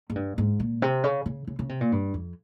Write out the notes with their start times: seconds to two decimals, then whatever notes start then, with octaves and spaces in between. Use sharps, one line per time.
0.10 G#2
0.15 G2
0.38 G#2
0.60 A#2
0.82 C3
1.04 C#3
1.26 C#3
1.47 C#3
1.59 C#3
1.69 C3
1.81 A#2
1.92 G2
2.14 F2